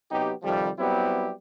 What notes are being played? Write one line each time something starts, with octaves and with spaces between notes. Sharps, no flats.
C3 F#3 B3 D#4 G4
F2 C3 D#3 F3 G3
F#3 G3 B3 C4 E4 G4